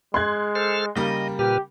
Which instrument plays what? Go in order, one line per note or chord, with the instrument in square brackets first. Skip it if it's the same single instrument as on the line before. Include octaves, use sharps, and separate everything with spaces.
[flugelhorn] G#3 [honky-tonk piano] C6 F#6 G#6
[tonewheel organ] A4 C5 F6
[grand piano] C#3 G3 A#3 [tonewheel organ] D#5
[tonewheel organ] A#2 B4 F6 [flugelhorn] G4